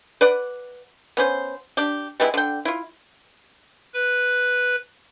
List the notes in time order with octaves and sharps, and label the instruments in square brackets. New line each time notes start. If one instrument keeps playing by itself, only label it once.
[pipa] B4 D5 F#5
B3 C#4 C5
D4 G4
G3 G#3 B3 E4
D3 G5
E4 F4
[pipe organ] B4